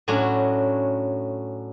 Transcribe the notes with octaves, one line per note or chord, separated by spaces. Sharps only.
A2 F#3 C#4 D4 F#4